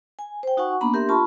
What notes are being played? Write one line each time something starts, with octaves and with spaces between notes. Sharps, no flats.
G#5
C5 G5
D#4 F#4 F#5 G#5 C#6
A#3 B3 D4 A#5 B5
D4 G4 A#4 E5 C6
F4 A5 B5 C#6